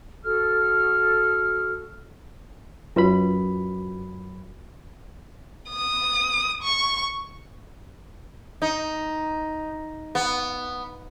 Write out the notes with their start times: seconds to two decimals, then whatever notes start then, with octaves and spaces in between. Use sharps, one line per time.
0.23 F#4 A4 F6
2.96 F#2 F4 F#4 B4 B5
5.69 D#6
6.62 C#6
8.62 D#4
10.15 B3